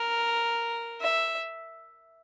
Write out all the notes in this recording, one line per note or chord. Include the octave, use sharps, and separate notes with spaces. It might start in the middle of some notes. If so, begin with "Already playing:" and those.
Already playing: A#4
E5